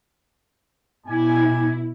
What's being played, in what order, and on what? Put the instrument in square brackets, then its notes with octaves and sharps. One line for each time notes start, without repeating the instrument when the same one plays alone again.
[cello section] B2 E4 [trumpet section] G3 G#5